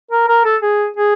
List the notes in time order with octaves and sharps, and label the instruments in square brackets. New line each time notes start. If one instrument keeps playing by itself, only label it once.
[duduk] A#4
A#4
A4
G#4
G#4